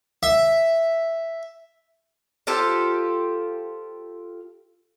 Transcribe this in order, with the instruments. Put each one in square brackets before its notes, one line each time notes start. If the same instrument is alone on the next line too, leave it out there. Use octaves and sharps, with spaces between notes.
[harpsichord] E5
[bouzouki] F4 G4 A4 C5